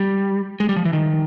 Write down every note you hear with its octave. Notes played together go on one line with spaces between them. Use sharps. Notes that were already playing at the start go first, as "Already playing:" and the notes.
Already playing: G3
G#3
G3
F3
E3
D#3